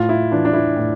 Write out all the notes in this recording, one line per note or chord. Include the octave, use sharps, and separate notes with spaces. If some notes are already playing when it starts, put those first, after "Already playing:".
Already playing: A2 F4
E4
E3 D4
D4
E4
A2